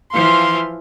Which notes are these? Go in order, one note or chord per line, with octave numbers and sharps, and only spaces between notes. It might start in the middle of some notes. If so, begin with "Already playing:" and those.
E3 F3 F5 C6